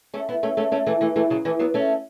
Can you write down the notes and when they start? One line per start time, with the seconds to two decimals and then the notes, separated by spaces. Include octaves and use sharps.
0.14 A3 C#4
0.29 B3 E4
0.43 A3 C#4
0.57 A3 C#4
0.72 A3 C#4
0.86 E3 A3
1.01 E3 A3
1.16 E3 A3
1.30 C#3 F#3
1.45 E3 A3
1.59 F#3 B3
1.74 A3 C#4